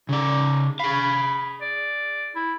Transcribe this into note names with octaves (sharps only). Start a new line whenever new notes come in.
C#3 D#4 D5
G#4 F5 B5
D5
E4